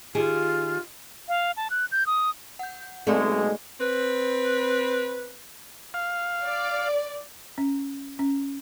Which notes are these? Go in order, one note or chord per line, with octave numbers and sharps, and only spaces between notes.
D#3 F4 G4 G#4
F5
A5
F#6
G6
D#6
F#5 G6
B1 G#3 A3 C4 G#4 D5
C4 B4
F5
D5
C#4
C#4